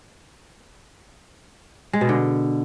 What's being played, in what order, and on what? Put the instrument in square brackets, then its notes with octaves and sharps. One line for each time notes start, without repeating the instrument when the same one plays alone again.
[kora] G#3
B2
D3